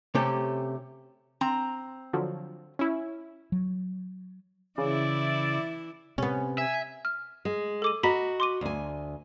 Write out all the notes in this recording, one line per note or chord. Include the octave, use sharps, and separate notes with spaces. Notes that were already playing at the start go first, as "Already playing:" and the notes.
C3 A3 C#4 G4 A4
C4 A#5
D3 F3 F#3
C#4 E4
F#3
C#3 E3 E4 D5
C3 B3 C#4
E5 G#5
F6
G#3
A4 D6 D#7
F#4 D#5 A#5 B5 B6
C6 D6 D#7
D2 G#5